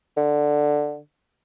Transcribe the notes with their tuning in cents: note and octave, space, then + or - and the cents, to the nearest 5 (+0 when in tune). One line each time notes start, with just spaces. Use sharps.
D3 +5